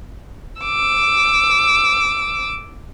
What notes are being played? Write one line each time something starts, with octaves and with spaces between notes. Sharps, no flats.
D6 E6